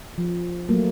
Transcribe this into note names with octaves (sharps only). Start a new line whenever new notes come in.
F3
F#3 A3 A#3